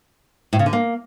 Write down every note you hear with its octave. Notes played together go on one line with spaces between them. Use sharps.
A2
C#3
D3
A#3